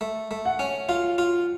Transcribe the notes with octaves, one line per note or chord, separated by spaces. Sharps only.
A3
A3
F#5
C#4
F4 F5
F4